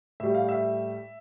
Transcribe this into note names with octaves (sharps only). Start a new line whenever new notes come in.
A2 G3 E5
F5
E5